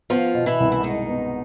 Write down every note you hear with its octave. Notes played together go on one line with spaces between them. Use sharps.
F3 B3 F4
B2
E3 E4
C2
E4
D#3 G#3 D#4
B3